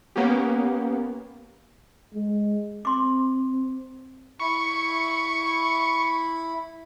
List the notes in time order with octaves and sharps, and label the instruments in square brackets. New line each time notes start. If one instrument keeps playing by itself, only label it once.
[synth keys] A#3 B3 C#4 G4
[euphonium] G#3
[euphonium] C4 [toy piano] C6 D6
[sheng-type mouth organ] E4 B5 [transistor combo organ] C#6